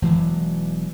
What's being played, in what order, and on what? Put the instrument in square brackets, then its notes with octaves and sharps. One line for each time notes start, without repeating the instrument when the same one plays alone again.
[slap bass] E1 E3 F#3 G#3